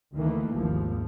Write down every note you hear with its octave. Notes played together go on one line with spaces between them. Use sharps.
D2 D#3 E3 A3 A#3
G#1 D#2 F3